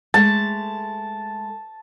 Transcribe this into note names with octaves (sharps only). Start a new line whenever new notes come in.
G#3 A3 A4 A5